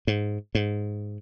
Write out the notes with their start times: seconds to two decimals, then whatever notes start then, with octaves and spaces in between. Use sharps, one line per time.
0.07 G#2
0.55 G#2